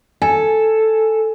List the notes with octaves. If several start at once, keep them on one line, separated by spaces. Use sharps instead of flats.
A4 G#5